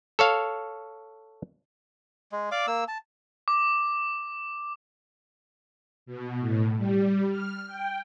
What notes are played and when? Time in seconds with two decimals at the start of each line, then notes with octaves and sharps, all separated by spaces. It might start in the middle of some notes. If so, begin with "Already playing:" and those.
0.19 A4 C#5 F5
2.32 G#3
2.52 D5 F5 D6
2.67 A#3 E6
2.88 A5
3.48 D6
6.06 B2
6.40 A2
6.77 G3
7.30 F6
7.67 G5